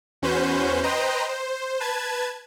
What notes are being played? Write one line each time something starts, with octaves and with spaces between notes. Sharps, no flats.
E2 C#4 F#4 B4 C5 G6
B4 C5 D#5 G5 A#5 C6
C5
B4 A5 G#6